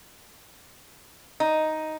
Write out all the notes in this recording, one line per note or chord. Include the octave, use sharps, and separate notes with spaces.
D#4